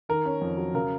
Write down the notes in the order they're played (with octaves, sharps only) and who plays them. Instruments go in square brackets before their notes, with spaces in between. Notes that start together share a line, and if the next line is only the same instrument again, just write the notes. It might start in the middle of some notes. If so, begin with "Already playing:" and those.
[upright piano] D#3 A#4
C#4
F2
F#3
C#3 A#4